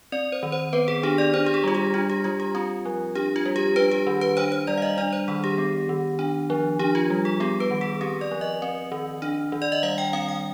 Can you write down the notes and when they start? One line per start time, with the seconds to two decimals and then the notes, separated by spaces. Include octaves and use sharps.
0.12 C4 D5
0.32 C5
0.43 D#3
0.52 C5
0.73 B3 B4
0.88 G#4
1.03 D4 G4
1.18 D5
1.34 D4 C5
1.46 G4
1.54 G#4
1.64 G3 F4
1.75 G4
1.94 D4 F4
2.10 G4
2.24 G3 F4
2.40 G4
2.55 C4 F4
2.86 F3
3.15 D4 G4
3.36 F4
3.46 G3
3.56 G4
3.76 D4 B4
3.91 G4
4.07 D#3
4.21 B4
4.37 D4 C5
4.52 C5
4.67 G3 D5
4.78 F5
4.82 D#5
4.98 D4 D5
5.13 C5
5.28 D#3 G#4
5.44 G4
5.58 B3
5.89 D#3
6.19 D4
6.50 F3
6.79 D4 G4
6.95 F4
7.10 G3
7.25 G#4
7.40 B3 G4
7.60 B4
7.71 D#3
7.81 G#4
8.01 C4 G4
8.21 D5
8.31 F3
8.41 D#5
8.62 C4
8.92 D#3
9.22 D4
9.52 D#3
9.62 D5
9.72 D#5
9.83 G3 F5
9.98 G5
10.13 C4 F5
10.28 G5